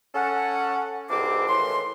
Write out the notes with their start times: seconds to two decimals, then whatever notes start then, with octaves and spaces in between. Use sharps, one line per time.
0.14 C#4 A4 F#5
1.09 C2 G#2 B2 C4 D6
1.48 D#2 A2 E3 C6